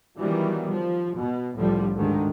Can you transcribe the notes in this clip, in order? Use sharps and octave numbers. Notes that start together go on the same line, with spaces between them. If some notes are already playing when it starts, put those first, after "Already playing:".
D#3 E3 F#3 G3 B3
F3
B2
C2 A2 D3 F3 G3
D2 G#2 D3 D#3